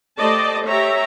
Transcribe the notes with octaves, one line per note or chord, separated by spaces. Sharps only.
A3 G4 C5 D5 D#5 A5
G4 C#5 E5 A#5